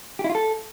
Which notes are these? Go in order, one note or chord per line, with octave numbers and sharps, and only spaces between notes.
G4
E4
F4
A4